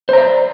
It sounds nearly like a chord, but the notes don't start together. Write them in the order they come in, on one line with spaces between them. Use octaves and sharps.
C5 A#5 E5 D5